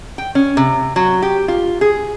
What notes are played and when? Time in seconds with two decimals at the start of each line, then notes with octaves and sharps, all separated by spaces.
0.18 G5
0.35 C#4
0.57 C3
0.96 F#3
1.22 G4
1.48 F4
1.81 G#4